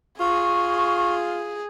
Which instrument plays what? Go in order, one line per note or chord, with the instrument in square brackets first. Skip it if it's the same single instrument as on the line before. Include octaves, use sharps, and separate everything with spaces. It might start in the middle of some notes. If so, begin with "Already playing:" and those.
[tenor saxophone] F4 [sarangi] G#4 [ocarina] C#6